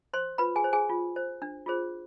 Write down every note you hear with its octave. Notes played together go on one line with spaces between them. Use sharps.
C5 C6
F4 B4 B5
G#4 G#5
C5
G#4 G#5
F4
C5
D4
F4 G#4 C5